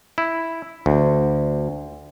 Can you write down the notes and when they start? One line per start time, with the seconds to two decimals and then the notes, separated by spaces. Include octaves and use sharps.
0.18 E4
0.86 D2